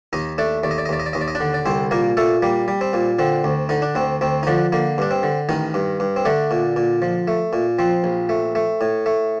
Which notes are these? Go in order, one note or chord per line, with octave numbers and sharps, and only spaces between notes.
D#2 D#4 D#5
A3 D4 D5
D#2 D5
D#5
D5
D#5
D#2 D5
D#5
D5
D#2 D#5
D5
D#5
D4 D5
D3
D5
C2 C4 C5
A#2 A#3 A#4
A#2 A3 A4
G3 A#3
G3
C4
A#2
D3 C4
D2
D3 D#4
D4
D2 C4
D2 C4
D#4
D3 F3 D4
D3 A#3
G2 D4
C4
D3
A1 D#3 D#4
G2
G2
C4
D3 A3 D4
A#2
A#2
F3
A3
A#2
F3 C4
A#1
A3
A3
A2
A3